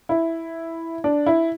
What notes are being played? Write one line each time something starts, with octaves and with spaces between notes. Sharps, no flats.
E4
D4
E4